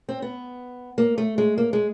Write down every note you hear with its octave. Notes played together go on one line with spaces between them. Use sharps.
C4
B3
A#3
A3
G#3
A#3
G#3